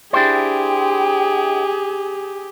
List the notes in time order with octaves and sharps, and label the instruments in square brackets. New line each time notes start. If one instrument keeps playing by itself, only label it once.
[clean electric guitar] D4 E4 C5 [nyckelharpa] G4 [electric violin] G#4 [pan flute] G5